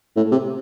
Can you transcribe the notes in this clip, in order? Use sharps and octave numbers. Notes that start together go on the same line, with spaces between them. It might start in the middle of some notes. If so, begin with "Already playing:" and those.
A2
C3